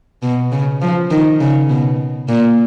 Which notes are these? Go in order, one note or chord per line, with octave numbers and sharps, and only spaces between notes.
B2
C#3
F3
D#3
C#3
B2
A#2